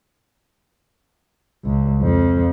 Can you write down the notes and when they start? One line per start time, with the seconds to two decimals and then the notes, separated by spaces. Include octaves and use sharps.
1.65 C#2
2.01 F2